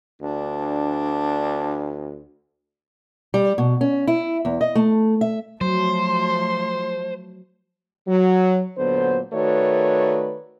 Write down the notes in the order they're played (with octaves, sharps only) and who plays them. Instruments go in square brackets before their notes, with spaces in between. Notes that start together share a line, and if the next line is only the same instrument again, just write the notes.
[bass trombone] D2 [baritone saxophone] D4
[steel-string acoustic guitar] G3
B2
C#4
E4
E2
D#5
A3
E5
[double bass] F3 A3 [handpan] F#3 [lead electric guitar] C5 [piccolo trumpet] C6
[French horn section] F#3
A#2 D3 F#3 B3 C5
D#3 A3 F#4 B4 C#5 D5